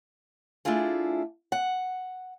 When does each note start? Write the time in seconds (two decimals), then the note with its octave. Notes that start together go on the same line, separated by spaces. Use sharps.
0.65 A3 D4 E4 F4 G#4
1.52 F#5